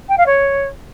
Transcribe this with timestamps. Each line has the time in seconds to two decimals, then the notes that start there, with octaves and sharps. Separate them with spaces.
0.09 G5
0.18 F5
0.26 C#5